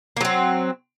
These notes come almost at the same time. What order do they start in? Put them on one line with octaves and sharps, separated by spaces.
A#3 F#3 C4